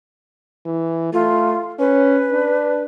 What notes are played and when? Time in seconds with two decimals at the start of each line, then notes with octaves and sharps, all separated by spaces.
0.65 E3
1.13 A3 F4
1.79 C#4 B4
2.31 D4